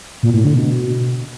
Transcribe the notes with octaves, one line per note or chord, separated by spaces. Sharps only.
A#2
A2
D3
B2